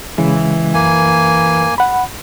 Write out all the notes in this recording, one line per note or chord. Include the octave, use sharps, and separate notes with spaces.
C#3 E3 G#3
F#2 A#3 G#5
F#5 B5